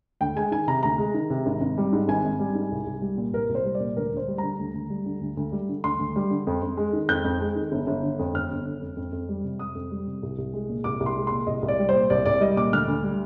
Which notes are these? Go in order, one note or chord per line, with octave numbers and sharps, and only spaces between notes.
D2 G5
G#3 G#5
D#3 G#5
C3 A#5
D2 A#5
G#3
D#3
C3
G#1
G#1
G3
G#2
G#1 G#5
G#1
G3
G#2
C2
C2
G3
A#2
C2 A#4
C2
C5
G3
D5
A#2
D2 A#4
D2 C5
G3
D3 A#5
D2
D2
G3
D3
D2
D2
G3
D3
D2 C6
D2
G3
D3
F2
F2
G#3
D#3
F2 G6
F2
G#3
D#3
G1
G1
D3
F2
G1 F6
G1
D3
F2
F2
F2
G3
C3
F2 D#6
F2
G3
C3
C2
C2
G#3
A#2
C2 D6
C2
C6
G#3
A#2 C6
C2 D#5
C2
D5
G3
C5
A#2
C2 D5
C2 D5
G3 D#5
A#2 D6
D2 F6
D2
G3